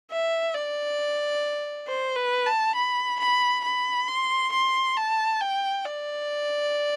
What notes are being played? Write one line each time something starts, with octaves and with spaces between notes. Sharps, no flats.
E5
D5
C5
B4
A5
B5
B5
B5
C6
C6
A5
G5
D5